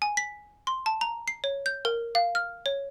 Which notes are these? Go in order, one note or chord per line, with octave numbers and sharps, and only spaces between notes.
G#5
B6
C6
A5
A#5
C7
C#5
G6
A#4
F5
F6
C#5